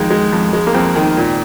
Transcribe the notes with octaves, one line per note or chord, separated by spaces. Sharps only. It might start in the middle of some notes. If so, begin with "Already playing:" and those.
Already playing: F2 D#3 G#3
G#3
F2
G#3
A#3
F2 C4
D#3
A#2